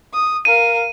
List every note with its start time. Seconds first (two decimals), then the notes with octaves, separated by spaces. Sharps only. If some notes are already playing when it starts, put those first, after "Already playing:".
0.13 D#6
0.45 A#4 F5 D#7